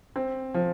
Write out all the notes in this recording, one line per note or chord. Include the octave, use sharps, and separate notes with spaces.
C4
F3